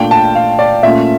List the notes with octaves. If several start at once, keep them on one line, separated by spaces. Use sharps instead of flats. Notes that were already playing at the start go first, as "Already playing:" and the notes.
Already playing: A#2 A3 D4 F4 G5
A5
F5
D5
A#2 A3 C#4 F4 E5